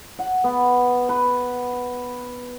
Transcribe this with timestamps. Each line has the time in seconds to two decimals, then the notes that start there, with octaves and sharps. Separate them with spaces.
0.19 F#5
0.44 B3
1.09 B4